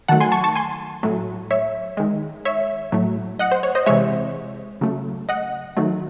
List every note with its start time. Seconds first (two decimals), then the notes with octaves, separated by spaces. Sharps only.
0.08 D#3 F#3 A3 F#5 A5
0.20 G#5 C6
0.32 A5 C#6
0.44 A5 C#6
0.55 G#5 C6
1.03 A2 F#3 A3
1.51 C#5 E5
1.97 D#3 G#3
2.45 C#5 E5
2.92 A2 F#3 A3
3.39 D#5 F#5
3.52 C5
3.63 C#5
3.75 C5 D#5
3.86 C3 E3 G#3 C#5 E5
4.81 C#3 F#3 A3
5.29 D#5 F#5
5.77 D#3 F#3 A3